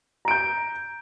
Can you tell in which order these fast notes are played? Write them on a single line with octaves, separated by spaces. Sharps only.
A#5 D7 G6